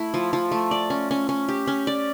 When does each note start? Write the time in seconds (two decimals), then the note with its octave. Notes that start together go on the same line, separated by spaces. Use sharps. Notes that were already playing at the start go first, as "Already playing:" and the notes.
Already playing: A3 E4
0.14 F3
0.33 F3
0.51 A3
0.71 D5
0.90 C#4
1.11 C#4
1.29 C#4
1.49 G4
1.67 C#4
1.87 D5